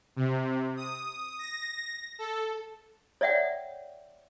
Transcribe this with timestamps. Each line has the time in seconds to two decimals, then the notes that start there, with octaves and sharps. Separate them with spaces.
0.16 C3
0.77 D#6
1.39 A#6
2.19 A4
3.21 C#5 D5 E5 F#5 G5